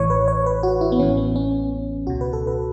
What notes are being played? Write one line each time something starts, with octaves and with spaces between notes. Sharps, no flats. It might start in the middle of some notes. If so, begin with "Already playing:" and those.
Already playing: A1 A2 E3 C#5
B4
C#5
B4
F#4
E4
B3
A1 A2 E3 C#4
B3
C#4
C#2 B2 F#4
B4
A4
B4